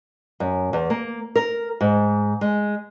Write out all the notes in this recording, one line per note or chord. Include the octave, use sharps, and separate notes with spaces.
F#2
E2
A#3
A#4
G#2
G#3